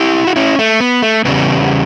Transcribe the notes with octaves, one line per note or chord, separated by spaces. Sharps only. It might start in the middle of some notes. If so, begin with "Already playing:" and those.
Already playing: E4 G4
F#4
C#4 E4
A3
B3
A3
E2 C#3 G3 B3